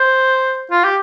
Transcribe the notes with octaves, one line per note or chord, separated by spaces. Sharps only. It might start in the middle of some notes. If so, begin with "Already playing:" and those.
Already playing: C5
F4
G4